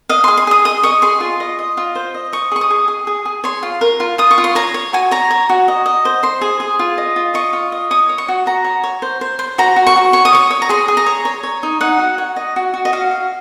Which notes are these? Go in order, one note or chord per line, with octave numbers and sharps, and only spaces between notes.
D#5 F5
C6
G#4
C6
G#4 D#6
D#5 D#6
D#5 C#6
G#4 C6
F4
D#5
D#5
F4
C5
D#5
D#5 C#6
G#4 C#6
D#6
G#4
G#4
G#4
G#4
C#5 C6
F4
A#4
F4
F4 D#6
C#6
F4
C6
C#5 A#5
C#5
F#4 G#5
C#5 A#5
C#5
F#4
D#5
D#5
C5
C5 C6
G#4
G#4
F4
D#5
F4
D#5 C#6
F4
D#5
C#5 D#6
C#5
C#6
F#4
F#4 A#5
C#5
C#5
C5
C5
C5
F#4 A#5
F#4
C#6
F#4
C#5 C#6
D#6
C#5 C#6
C#5
A#5
G#4 C6
G#4
A#5
C#5
C#5
C#5
D#4
D#4 F#5
F#4
C#5
D#5
F#4
F#4
D#5
F#4 F5
F#4